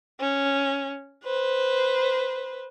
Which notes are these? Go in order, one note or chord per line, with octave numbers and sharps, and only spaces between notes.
C#4
B4 C5